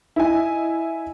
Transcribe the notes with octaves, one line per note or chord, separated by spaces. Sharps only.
E4 D#5 G#5